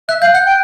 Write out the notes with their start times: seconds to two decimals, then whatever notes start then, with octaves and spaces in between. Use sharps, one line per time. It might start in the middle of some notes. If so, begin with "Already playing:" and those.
0.09 E5 F#6
0.21 F5 G6
0.33 F#5 F#6
0.46 G5